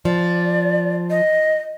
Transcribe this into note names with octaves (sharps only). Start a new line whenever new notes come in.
F3 D5
D#5